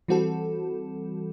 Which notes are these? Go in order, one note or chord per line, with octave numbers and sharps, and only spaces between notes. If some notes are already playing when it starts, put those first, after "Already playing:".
E3 G3 C4 F#4 A4